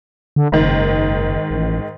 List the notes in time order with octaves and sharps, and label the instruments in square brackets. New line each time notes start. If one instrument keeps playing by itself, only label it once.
[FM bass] D3
[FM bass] F#1 [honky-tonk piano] G#2 D#3
[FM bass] A1